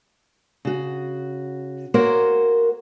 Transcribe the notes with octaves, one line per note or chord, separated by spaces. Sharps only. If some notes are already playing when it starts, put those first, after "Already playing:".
C#3 F#4
A#3 F#4 A#4 C5 C#5 F#5